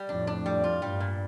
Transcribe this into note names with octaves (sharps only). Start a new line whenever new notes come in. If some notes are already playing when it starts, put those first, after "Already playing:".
Already playing: G3
F2 A2 D4
D4
G3
F4
G2 G3
A#2